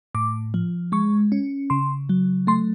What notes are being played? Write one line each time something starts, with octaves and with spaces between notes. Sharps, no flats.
A2 D6
F3
G#3 C#6
C#4
C#3 C6
F#3
A3 C6